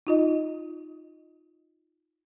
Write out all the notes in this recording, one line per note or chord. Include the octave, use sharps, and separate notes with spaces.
D#4 F4 D#5